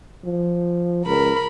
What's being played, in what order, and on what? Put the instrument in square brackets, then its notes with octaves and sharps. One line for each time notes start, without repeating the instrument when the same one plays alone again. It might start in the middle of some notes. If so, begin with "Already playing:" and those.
[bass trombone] F3
[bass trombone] C#2 [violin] A#4 B5